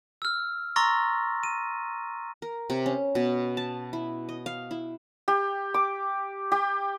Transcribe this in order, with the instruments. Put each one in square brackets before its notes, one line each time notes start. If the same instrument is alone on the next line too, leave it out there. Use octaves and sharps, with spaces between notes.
[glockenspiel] E6 F6
A#5 C6 C#6 E6 A6 A#6
D#7
[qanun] A#4
C3
C#4
B2
A5
E4
D#5
F5
E4
[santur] G4
D6
G4